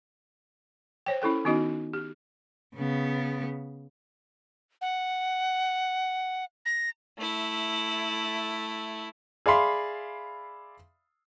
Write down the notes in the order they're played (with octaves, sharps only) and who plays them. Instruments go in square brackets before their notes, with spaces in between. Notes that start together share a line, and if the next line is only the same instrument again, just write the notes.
[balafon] C5 C#5 G5
C#4 E4 A4 G5
D#3 B3 C#4 D#4 F#4 D#5
G4
[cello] C#3 B3
[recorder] F#5
A#6
[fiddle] A3 E4
[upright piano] G#4 D5 E5 F5 B5 C6